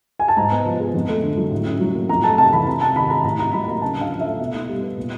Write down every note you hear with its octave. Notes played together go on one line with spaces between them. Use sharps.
G#5
A5
G#2 A#5
B3
F3
G#3
F2
A3
D3
F#3
A2
C#4
F#3
A#3
F2 A#5
A3 A5
C3 A5
E3 B5
C3 A#5
C3 A5
D#3 B5
G#3 A#5
A2 A#5
D#4 A#5
F#3 B5
A#3 A#5
C#3 A5
D4 F5
F3
A3 E5
B2
D#4
G3
B3
A#2